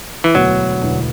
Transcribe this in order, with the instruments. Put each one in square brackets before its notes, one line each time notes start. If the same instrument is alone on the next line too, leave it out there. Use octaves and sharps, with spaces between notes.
[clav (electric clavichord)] E3
[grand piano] E1 D2 D3 B3 E4 [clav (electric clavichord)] F#3
[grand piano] E1 D2 D3 B3 E4